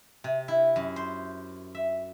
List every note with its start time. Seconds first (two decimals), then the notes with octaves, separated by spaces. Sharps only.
0.24 C3
0.48 E4
0.76 F#2
0.96 C5
1.75 E5